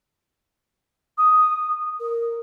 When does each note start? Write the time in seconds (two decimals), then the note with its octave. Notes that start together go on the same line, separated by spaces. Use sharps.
1.18 D#6
2.00 A#4